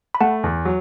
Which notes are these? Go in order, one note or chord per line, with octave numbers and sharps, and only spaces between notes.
B5
A3 F#5 A5
E2
F#3